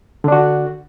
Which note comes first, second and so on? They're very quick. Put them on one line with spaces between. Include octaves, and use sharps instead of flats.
D3 D4 F#4